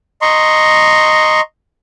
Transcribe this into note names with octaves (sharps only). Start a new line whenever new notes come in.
D#5 A#5 C6 C#6